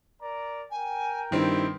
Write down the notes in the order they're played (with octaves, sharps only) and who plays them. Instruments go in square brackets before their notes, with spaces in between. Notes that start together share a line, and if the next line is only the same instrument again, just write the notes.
[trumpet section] A#4 D5 A#5
[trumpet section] A#4 G5 [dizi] G#5
[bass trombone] G2 [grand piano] D#3 C4 [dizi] E4